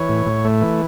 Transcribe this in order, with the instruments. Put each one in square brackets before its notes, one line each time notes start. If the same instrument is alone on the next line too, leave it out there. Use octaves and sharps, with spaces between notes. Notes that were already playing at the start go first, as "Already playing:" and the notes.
Already playing: [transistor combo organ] E3 C#5
A2
A2
A3
E3